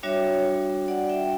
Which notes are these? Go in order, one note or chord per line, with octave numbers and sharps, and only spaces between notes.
G3 D4 F#4 C#5 E5
D5 F#5
E5 G5